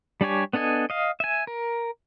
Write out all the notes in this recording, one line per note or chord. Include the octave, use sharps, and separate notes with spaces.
G3 D4 G4 C#5 G#5
B3 D4 A4 D#5 G#5
D#5 F5
E5 G#5
A#4